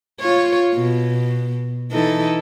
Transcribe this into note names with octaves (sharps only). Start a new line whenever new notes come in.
F4 C#5
B2
E3 D#4 A4